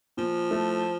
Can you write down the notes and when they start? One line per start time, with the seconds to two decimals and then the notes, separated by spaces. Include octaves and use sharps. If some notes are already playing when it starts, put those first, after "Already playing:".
0.17 A#2 F3
0.50 A3 E4